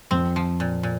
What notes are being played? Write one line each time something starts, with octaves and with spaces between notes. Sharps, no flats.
F2 C4
F3
A#2
A#2